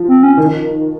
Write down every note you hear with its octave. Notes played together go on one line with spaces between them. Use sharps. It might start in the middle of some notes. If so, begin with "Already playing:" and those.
Already playing: F3
C4
C#4
D#3